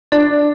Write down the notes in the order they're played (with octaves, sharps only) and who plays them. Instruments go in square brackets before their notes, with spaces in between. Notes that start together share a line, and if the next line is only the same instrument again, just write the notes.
[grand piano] D4 [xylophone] D5